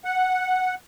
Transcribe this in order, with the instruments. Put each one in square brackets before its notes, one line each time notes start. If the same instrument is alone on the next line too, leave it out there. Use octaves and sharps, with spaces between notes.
[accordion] F#5